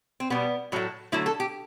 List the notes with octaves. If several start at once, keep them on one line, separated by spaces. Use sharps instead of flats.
C4
B2 G3 B3
A2 F#3 A3
D3 F#3 A3 E4
A4
G4